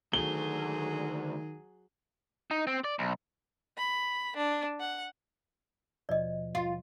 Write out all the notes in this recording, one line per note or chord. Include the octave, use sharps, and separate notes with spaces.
D2 D#3 F#3 A3 G#4 G7
D#4
C4
D5
B1
B5
D4
F#5
D#2 B2 F3 D5 D#5
F4